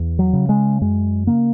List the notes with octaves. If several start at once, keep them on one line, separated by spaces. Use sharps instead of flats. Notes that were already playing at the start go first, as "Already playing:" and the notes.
Already playing: E2
F#3
C#3
G#3
F#2 G#3
C#3 A#3